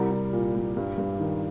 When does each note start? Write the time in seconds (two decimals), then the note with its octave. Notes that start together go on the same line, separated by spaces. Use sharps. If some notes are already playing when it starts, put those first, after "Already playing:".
Already playing: C2 G3 A#4
0.11 C2
0.33 A#2
0.54 G3
0.77 G2
0.98 G2
1.20 D#3